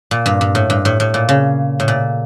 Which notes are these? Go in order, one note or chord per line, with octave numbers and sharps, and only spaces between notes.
A#2
G2
G2
A2
G2
A2
A2
A#2
C#3
A2
A#2